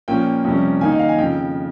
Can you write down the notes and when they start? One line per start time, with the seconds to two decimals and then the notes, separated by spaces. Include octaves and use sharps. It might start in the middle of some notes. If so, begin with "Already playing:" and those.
0.08 A#2 F3 A#3 C#4 G5
0.44 F2 C3 G3 C#4
0.81 D#3 A#3 D#4 G#5
0.91 D#5
0.99 F5
1.09 G#5
1.18 F2 C#3 F3 G5